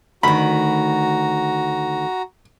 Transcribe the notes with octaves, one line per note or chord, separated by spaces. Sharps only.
D2 D#3 F#4 A#5 B5